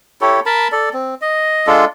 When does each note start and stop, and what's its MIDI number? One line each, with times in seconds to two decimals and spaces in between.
0.21 0.40 64
0.21 0.40 67
0.21 0.40 69
0.21 0.40 73
0.46 0.68 70
0.46 0.68 81
0.46 0.68 83
0.72 0.89 69
0.72 0.89 74
0.93 1.15 60
1.21 1.66 75
1.67 1.85 56
1.67 1.85 62
1.67 1.85 65
1.67 1.85 69